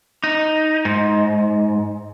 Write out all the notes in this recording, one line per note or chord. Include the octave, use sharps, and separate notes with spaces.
D#4
G#2